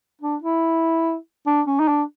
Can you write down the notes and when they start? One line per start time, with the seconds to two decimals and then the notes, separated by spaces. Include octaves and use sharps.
0.21 D4
0.42 E4
1.46 D4
1.67 C#4
1.79 D#4
1.88 D4